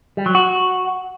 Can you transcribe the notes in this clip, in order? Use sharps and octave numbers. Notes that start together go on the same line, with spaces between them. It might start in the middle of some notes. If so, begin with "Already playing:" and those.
G3
F#3
F#4